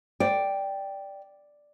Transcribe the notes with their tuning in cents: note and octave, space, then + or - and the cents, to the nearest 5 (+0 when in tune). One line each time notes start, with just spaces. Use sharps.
D5 +0 G5 +0